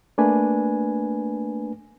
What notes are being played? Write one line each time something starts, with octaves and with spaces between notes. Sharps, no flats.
A3 A#3 D4 B4 G#5